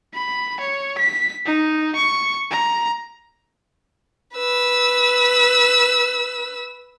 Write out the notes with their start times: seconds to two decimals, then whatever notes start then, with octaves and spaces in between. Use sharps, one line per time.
0.14 B5
0.61 C#5
0.99 B6
1.46 D#4
1.96 C#6
2.51 A#5
4.35 B4 E6